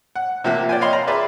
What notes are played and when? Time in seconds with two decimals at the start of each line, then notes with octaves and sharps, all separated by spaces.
0.16 F#5
0.44 C3 F3 A#3 E5 F#6
0.69 D5 G5 G#5
0.81 C#5 D#5 F5 B5 C6
0.93 A#5 B5
1.07 G#4 B4 D5 E5